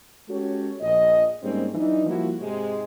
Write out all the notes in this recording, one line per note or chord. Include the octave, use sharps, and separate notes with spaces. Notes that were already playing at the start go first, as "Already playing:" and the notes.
G#3 C#4 F#4 G4 A4 C#5
A#1 D#5
G#2 G3 A#3 C4 C#4
E3 F#3 D4 D#4
F3 G3 A#3 E4 F#4
G#2 C3 G#3